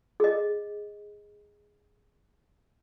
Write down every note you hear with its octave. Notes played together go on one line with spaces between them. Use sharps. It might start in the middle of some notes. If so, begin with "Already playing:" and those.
G#4 D#5